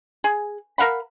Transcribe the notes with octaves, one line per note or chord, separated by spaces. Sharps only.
G#4
A#4 F5 F#5 B5